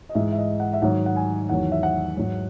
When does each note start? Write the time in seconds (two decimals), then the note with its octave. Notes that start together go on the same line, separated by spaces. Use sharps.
0.09 D#5
0.15 G#2 E3 G#3 E5
0.32 E5
0.38 D#5
0.60 F#5
0.73 E5
0.82 G#2 D#3 F#3 F#5
1.06 F#5
1.16 G#5
1.49 E2 D#3 F#3 F#5
1.72 E5
1.83 F#5
2.17 G#2 F#3